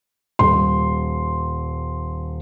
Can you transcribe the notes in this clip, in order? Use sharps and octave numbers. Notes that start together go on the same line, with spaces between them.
D#1 C6